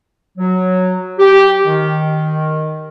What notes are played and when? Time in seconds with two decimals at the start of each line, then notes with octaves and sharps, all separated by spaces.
0.38 F#3
1.19 G4
1.65 D#3